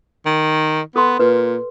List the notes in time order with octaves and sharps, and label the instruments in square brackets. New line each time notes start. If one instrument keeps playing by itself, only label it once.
[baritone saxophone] D#3
[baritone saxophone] B3 [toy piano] A4 C6
[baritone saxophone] A#2 [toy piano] B4